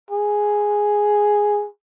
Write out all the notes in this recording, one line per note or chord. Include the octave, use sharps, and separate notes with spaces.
G#4